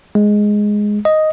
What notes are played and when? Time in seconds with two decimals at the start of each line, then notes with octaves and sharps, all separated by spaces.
0.15 G#3
1.05 D#5